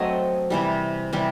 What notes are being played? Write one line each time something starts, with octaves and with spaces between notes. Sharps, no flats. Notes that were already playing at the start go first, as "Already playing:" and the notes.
Already playing: F#3 A3 C4 D#5
C3 E3 G3
C3 E3 G3